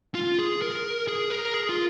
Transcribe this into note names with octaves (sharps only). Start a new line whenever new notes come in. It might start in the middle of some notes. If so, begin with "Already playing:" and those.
F4
G#4
A#4
G#4
A#4
G#4
F4